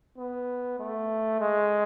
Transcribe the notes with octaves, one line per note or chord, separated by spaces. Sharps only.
B3
A3
G#3